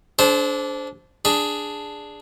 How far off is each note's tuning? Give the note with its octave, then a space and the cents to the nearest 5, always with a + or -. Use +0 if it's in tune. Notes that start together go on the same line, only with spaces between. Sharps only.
D4 -20 G#4 +45 C5 +0
D4 +0 G#4 +0 B5 -20